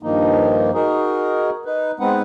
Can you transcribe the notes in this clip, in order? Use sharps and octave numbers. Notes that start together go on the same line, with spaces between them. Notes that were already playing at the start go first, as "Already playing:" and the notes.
G2 D#3 F3 A#3 D#4
D#4 F#4 G#4 A#4
D#4 B4
G#3 B3 C4 D#4 B4 F#5